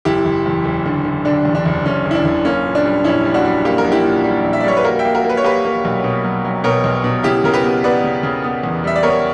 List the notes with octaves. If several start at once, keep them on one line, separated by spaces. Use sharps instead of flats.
F#1 E4 G4
F#1
E2
F#1
D3
D3
D3 D4
E2
D4
F#1
F#1 C#4
F#1
E4
D4
F#1
A#3 C#4
A#2
D4
G3
A#1 C#4 E4
G3
D4 F#4
G3
A#3 G4
A#4
A#1
E4 G4
A#2
G3
A#1
E5
D5
G3 C#5
B4
A#3 F#4 A#4
E5 G5
A#3
F#4 A#4
A#3
B4
C#5
A#3 G4 B4
A#3
B1
B2
F#3
F#3
B2 A#4 C#5
B1
B2
C#3 E4 G4
C#3 A#4
G4 B4
B3
B3 B4 D5
C#3
C#3
B3
E2
G3 E5
D5
B3 A#4 C#5